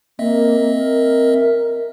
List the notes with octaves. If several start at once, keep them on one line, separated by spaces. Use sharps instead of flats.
A#3 C4 D#5 E5
A#4